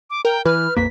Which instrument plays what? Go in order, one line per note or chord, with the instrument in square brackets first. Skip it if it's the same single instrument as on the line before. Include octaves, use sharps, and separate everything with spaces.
[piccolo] D6
[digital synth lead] A#4 [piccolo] G5
[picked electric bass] E3 [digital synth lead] B4 [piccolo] F6
[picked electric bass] A#1 F2 A#3 [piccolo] B6